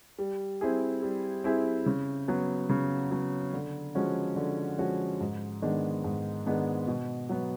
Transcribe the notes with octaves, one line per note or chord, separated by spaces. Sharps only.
G3
C4 E4 G#4
G3
C4 E4 G#4
C#3
F#3 B3
C#3
F#3 B3
D3
F3 G#3 C#4 F#4
D3
F3 G#3 C#4 F#4
G#2
D#3 G#3 B3 D4
G#2
D#3 G#3 B3 D4
B2
F#3 B3